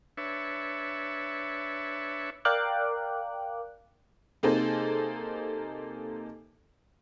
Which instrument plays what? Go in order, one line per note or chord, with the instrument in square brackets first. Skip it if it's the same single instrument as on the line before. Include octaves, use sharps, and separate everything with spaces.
[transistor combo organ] D4 B4 C#5 E5
[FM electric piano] A#4 D5 F5 G5 D6 F#6
[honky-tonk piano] C3 A#3 D#4 G#4 A4 C5